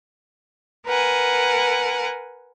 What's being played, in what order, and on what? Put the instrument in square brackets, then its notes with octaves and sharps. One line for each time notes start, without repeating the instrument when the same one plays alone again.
[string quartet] A#4 B4 F#5 G#5